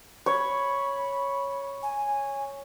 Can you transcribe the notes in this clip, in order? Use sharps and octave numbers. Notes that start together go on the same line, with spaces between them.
C#5 B5
G#5